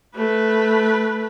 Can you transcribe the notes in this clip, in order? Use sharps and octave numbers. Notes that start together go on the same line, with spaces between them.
A3 B4